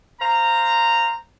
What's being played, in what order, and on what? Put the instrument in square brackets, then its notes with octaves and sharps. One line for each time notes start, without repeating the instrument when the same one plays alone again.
[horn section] C5 F5 A#5